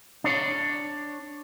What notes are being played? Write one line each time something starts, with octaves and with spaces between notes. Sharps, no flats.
D4 C#5